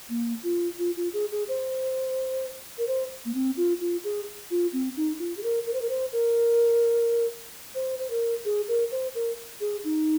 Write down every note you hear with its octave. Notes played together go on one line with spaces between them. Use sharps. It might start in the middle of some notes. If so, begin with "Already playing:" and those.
A#3
F4
F4
F4
G#4
G#4
C5
A#4
C5
A#3
C4
F4
F4
G#4
F4
C4
D#4
F4
G#4
A#4
A#4
C5
A#4
C5
A#4
C5
C5
A#4
G#4
A#4
C5
A#4
G#4
D#4